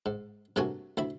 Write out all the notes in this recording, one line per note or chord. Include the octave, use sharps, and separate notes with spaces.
G#2
G2 C3 A3 A#3 F#4 G#5
D2 E4 B5